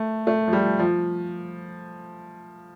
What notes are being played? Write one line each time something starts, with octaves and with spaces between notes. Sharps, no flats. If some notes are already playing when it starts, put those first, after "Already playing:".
Already playing: A3
A3
F3
G3
F3